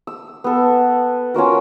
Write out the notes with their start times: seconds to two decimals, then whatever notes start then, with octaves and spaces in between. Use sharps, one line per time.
0.07 E6
0.44 B3 A4
1.34 C#4 F4 F#4 A#4